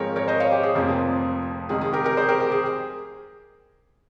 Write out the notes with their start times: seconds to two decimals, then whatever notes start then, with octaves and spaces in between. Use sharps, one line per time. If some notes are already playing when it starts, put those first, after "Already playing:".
Already playing: G#2 F3 G#3 C4 A#4 C#5
0.16 A#4 C#5
0.28 C5 D#5
0.40 C#5 F5
0.52 G4
0.63 G#4
0.75 F1 F2 C3 F3 A#3
1.69 C#2 C3 D#3 G#4
1.81 G#4
1.93 G4 A#4
2.04 G4 A#4
2.17 G#4 C5
2.29 G4 A#4
2.40 G4
2.52 G#4